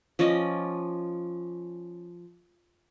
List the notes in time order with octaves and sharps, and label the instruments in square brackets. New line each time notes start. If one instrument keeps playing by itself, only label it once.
[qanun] F3 C#4 D5 D#5